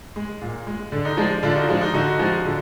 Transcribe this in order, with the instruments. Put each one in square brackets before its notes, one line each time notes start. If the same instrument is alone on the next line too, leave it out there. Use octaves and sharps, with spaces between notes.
[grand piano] G#3
A#2
G#3
D3 D4
D#4
F3 G#3 D4
D3 D4 F4
D#4 F#4
F3 G#3 D4
D#4
D3 D#4 F#4
F3 G#3
D3